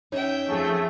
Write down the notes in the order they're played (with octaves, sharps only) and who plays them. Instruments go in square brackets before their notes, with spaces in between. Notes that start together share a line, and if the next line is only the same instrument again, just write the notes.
[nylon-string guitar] C#4 D#4 [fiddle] E5 G5
[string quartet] F2 [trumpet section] A3 G#4